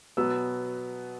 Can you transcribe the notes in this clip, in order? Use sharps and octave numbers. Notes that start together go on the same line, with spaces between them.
B2 F#3 B3 E6